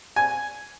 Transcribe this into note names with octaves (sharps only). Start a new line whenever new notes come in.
G#5